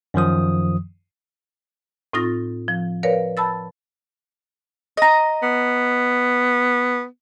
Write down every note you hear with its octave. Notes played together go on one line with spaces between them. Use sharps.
F#2 D#3 F3 D#6
A2 C4 D#4 F4 A6 A#6
F3
A#4 B4 C#5 D5 F5
A5 B5 E6 A6
D#5 A#5
B3